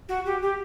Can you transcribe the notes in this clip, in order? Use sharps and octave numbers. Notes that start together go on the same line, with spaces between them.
F#4
G4
G4